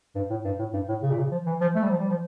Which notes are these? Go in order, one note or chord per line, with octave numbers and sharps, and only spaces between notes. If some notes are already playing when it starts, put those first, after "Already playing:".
G2
A2
G2
A2
G2
A2
C#3
A#2
C#3
F3
E3
F3
A3
G3
F3
G3
F3